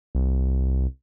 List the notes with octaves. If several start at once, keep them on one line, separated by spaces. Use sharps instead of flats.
C2